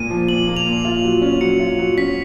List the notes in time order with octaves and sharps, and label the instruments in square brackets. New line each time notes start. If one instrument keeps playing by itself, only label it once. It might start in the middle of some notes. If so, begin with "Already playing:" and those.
Already playing: [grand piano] A#2 A#3 [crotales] D#7
[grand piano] F3
[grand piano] A#2 [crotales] F#7
[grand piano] A#3
[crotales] F7
[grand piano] A#2
F4
F#3
C#4
[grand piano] F#3 [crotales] C#7
[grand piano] F4
F#3
[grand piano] C#4 [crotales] B6